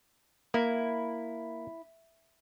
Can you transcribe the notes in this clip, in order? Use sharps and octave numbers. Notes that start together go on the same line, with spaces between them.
A#3 E4